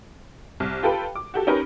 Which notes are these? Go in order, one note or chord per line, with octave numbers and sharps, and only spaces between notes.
C2
F4 G4 A4 B4 G5
D6
F#4 G4 A4
C#4 D#4 G4 A#4 B4